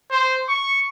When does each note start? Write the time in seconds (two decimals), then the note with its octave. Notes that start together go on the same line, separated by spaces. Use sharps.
0.11 C5
0.48 C#6